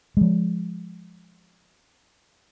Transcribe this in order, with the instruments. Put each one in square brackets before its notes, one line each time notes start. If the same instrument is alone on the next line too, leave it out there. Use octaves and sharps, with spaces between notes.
[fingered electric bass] F3 G#3